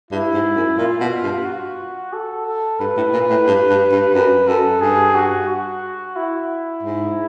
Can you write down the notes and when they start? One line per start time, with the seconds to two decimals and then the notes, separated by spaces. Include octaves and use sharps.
0.11 G2 E4
0.34 G#2
0.56 F#2
0.78 A#2 F4
1.00 B2
1.23 G2
1.45 F#4
2.13 A4
2.46 A4
2.80 G2 B4
2.97 A2
3.13 A#2
3.30 A2
3.47 G2
3.70 G2
3.92 G2
4.14 F#2 B4
4.48 F#2 A4
4.81 G2 G#4
5.15 F#4
5.49 F#4
6.16 E4
6.83 G#2